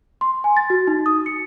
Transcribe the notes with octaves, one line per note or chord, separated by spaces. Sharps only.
C6
G#5
A6
F#4
D#4
D#6
C#7